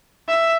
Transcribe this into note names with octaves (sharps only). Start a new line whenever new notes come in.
E5